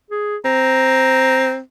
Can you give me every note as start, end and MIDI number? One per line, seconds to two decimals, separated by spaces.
0.10 0.36 68
0.45 1.60 60
0.45 1.55 82